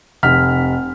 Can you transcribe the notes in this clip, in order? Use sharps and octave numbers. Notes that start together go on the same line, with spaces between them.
F1 F#5 F6 B6